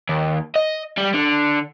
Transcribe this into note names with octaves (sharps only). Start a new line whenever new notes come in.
D#2
D#5
G3
D3